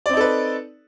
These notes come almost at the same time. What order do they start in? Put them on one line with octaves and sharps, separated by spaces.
D5 C4 D#4 A4 B4